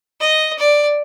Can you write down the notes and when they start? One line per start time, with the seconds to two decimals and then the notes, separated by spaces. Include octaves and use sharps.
0.20 D#5
0.58 D5